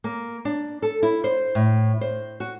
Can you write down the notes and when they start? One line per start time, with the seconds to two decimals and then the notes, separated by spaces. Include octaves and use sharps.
0.04 A#3
0.45 D4
0.82 A4
1.03 E4
1.24 C5
1.55 A2
2.01 C5
2.40 F#4